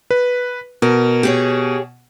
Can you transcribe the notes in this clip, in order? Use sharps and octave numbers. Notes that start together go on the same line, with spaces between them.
B4
B2 A#4
G4 G#4 C#5